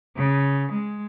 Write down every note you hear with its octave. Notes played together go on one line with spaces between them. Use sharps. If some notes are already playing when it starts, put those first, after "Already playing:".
C#3
G#3